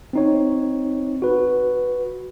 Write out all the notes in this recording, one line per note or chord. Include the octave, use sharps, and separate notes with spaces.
C4 D#4 C#5
F#4 B4